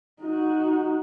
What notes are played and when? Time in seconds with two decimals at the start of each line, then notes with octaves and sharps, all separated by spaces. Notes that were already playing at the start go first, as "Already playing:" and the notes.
0.21 D#4 F#4